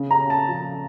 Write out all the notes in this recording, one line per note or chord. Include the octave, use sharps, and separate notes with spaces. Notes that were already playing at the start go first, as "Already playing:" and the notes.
Already playing: C#3
A#5
C#4
A5
F3